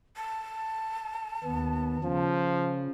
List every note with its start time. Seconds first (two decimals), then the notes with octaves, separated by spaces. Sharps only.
0.17 A5
1.44 D#2 B3
2.04 C#3 F3